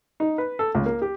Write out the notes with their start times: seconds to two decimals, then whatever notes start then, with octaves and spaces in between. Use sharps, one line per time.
0.20 D#4
0.38 B4
0.59 A4
0.75 C#2
0.86 A#3
1.02 G4